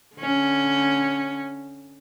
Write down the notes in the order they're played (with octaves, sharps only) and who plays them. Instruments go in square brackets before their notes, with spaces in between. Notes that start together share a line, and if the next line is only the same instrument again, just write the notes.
[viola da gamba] D3 C#4